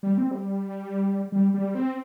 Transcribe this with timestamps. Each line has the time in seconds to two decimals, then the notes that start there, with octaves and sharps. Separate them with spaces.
0.03 G3
0.18 C4
0.31 G3
1.32 G3
1.54 G3
1.75 C4